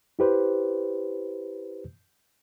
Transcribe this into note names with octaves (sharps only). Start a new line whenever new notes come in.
E4 G4 B4 C5